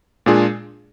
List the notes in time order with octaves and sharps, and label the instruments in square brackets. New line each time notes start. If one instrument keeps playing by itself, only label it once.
[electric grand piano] A#2 G#3 D4 F4 G#4